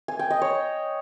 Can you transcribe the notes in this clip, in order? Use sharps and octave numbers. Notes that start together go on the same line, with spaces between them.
G#5
G5
D#5
C#5